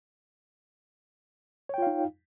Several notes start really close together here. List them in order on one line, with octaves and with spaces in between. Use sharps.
C#5 G5 F4 F5 D#4